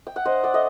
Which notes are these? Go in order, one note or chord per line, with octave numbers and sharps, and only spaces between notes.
G5
F#5
D4 C5 D#5
D5 F#5
A3 D#5